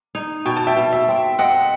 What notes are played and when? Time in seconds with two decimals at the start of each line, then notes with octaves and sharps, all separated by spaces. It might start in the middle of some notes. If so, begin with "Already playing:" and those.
0.15 D#4
0.46 B2 G5
0.57 A5
0.67 E5 G5
0.76 B2
0.93 E5
1.08 C4
1.39 C4 D#5 F#5